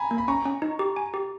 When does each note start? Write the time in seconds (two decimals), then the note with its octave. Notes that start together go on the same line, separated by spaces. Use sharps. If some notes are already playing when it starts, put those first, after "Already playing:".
Already playing: G#5 A#5 B5
0.11 A#3
0.18 B5
0.28 C#4 A#5 C#6
0.46 C#4
0.62 D#4
0.79 G4
0.96 G#5
1.14 G4